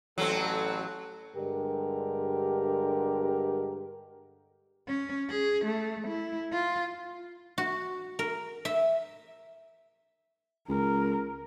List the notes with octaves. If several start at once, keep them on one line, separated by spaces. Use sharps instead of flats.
A1 F#3 C4 A4
G2 D3 G#3 G4 A#4
C#4
G#4
A3
E4
F4
F#4
A#4
E5
C#2 A#4